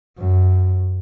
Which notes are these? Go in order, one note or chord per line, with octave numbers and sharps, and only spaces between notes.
F#2